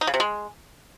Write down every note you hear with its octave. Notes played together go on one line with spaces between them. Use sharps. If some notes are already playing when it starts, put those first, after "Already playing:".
D#4
C#3
C3
G#3